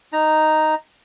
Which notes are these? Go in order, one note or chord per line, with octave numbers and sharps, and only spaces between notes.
D#4 A#5